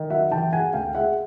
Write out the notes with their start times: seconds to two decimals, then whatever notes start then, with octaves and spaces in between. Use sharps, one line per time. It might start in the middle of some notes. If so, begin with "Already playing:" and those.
Already playing: D#3
0.10 F#3 E5 F#5
0.32 E3 G5 A5
0.52 G#3 F#5 G#5
0.73 D2 F5 G5
0.95 G#3 E5 F#5